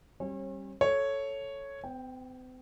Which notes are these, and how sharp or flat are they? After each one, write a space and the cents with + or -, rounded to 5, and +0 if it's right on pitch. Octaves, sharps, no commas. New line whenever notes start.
G3 -5 C#4 -45 C#5 -35
A4 +0 C#5 +0
C4 -45 G5 +5